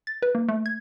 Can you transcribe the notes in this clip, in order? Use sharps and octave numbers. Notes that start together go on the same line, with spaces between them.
A6
B4
A#3
A3
G#6